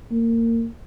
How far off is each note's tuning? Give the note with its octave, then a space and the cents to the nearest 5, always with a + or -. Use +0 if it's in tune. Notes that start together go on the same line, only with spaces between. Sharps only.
A#3 -25